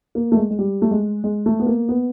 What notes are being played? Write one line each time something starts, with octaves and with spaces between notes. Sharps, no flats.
A#3
A3
G#3
G#3
G3
A3
G#3
G#3
A3
B3
A#3
B3